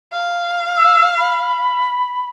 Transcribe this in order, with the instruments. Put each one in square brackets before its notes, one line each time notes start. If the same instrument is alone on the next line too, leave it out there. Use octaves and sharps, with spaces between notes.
[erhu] F5
[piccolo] E6
B5